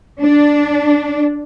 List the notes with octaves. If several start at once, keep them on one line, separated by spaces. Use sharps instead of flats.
D4